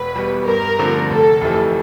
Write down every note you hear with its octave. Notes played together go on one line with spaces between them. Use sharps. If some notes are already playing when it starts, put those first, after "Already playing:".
Already playing: E1 B4
E2 B2 G3
G2 A#4
D3 F3 A3 C4
F1 A4
F2 C3 E3 A3